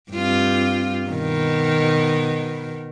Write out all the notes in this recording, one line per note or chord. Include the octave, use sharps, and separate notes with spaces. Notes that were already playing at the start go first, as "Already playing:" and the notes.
G2 C4 F4
B2 D#3